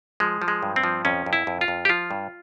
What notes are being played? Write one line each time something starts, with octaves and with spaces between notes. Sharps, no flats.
F3 G#3
F3
G#3
G2
C4
F3
F2 C#4
F2
E4
F2
F4
F2
G4
F3 F4
G2